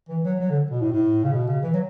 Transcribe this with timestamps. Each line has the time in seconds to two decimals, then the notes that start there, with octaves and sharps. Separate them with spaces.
0.09 E3
0.24 F#3
0.40 F#3
0.50 D3
0.71 B2
0.81 A2
0.92 A2
1.23 C#3
1.32 B2
1.48 C#3
1.63 E3
1.74 F#3